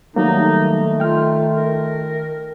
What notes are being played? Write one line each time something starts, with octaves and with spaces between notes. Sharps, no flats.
D#3 F#3 G3 A3 A#3 D#4
F4 G5 F6
A#4